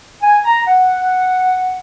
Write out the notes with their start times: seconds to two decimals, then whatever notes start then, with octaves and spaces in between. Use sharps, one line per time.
0.23 G#5
0.45 A#5
0.67 F#5